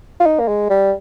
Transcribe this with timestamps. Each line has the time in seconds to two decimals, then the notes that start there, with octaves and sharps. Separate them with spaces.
0.20 F4
0.26 D#4
0.40 A#3
0.48 G#3
0.70 G3